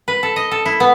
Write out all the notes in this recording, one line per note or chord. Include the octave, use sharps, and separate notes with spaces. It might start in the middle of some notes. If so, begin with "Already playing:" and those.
B4
A4
D#5
A4
E4
B3